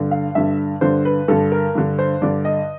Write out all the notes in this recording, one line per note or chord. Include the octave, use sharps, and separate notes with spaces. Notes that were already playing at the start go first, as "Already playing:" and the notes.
Already playing: G2 D3
F5
G2 D3 E5
G2 D3 C5
B4
G2 D3 A4
A#4
G2 D3
C5
G2 D3 D5
D#5